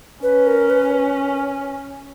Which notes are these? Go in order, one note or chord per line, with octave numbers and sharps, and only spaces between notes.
C#4 B4
A#4
B4